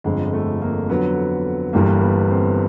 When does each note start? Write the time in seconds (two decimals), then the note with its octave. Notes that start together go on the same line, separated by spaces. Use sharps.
0.04 G1 F2 D3 G#3
0.33 A3
0.62 A#3
0.89 F2 D3 F#3 B3
1.73 G1 G2 E3 G3 A#3
2.01 B3
2.30 C4